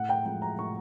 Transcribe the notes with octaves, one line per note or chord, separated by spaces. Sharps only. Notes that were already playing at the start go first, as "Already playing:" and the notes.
Already playing: A2 F#5
G5
F3 G#3 G5
A#5
A2 C#6